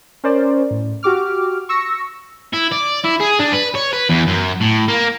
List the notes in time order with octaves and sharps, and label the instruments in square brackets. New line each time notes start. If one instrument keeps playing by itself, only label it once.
[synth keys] C#4 A#4 C5 D5
A2
F#4 G4 D6 F6
C#6 E6 A#6 C#7
[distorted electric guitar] E4
D5
E4
G#4
D4
B4
C#5
B4
E2
F#2
A2
A#3